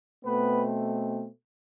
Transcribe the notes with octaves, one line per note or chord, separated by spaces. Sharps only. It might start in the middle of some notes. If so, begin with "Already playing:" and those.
B2 A3 B3 C4 B4